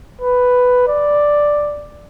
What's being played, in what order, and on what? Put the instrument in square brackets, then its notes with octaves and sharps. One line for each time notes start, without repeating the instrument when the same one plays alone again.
[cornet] B4
D5